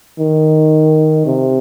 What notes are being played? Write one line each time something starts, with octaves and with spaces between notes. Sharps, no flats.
D#3
C3